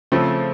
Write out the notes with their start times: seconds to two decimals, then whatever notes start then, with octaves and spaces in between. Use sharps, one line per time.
0.12 C#3 F3 A3 C4